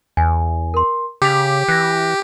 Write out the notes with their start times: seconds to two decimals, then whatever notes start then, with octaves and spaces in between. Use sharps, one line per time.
0.17 E2 G#5
0.74 A#4 C6
1.22 C#3 G4 D6 B6 F7
1.68 E3 F#6 A#6